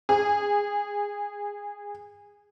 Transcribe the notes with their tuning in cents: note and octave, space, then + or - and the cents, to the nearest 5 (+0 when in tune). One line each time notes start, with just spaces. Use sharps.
G#4 -20